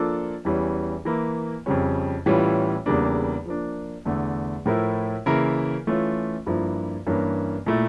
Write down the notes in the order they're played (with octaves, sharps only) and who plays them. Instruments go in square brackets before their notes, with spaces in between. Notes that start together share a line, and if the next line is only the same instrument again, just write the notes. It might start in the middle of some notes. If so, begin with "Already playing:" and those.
Already playing: [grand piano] F3 A#3 D4 F4 A4
E2 E3 G3 C#4
E3 A#3 E4
F2 C#3 G3 C#4
A2 E3 G3 C#4 F4
E2 C#3 G3 A#3 D4
F3 A#3 D4
E2 D3 A3
A2 F3 A3 E4 A#4
C#3 E3 A#3 E4 A#4
E3 A3 C#4 F4
G2 F3 A#3 E4
G2 E3 A#3 C#4
A#2 A3 E4